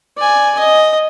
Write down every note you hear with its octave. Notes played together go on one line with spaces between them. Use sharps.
D5 G#5
D#5